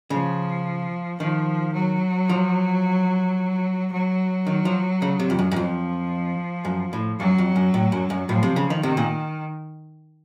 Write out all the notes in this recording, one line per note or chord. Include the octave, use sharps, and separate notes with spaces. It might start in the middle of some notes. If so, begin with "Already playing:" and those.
C#3 F3
D#3 F3
F#3
F3
F#3
D#3
F3
C#3
C3
F2
F#2
F#2
F2 F3
F#2
A2
F#2 F#3
F2
F#2
A2
F#2
F#2
A2 F3
C3
C#3
D#3
C3 D#3
A#2